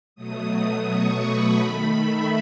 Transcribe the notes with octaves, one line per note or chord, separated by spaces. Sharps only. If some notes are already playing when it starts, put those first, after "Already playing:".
B2 F#3 A3 D#6
C#6
B5
D#3 A3
E5